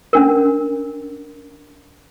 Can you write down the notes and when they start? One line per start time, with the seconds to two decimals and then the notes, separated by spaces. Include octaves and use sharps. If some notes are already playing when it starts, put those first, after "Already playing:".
0.13 C#4 D4 A#4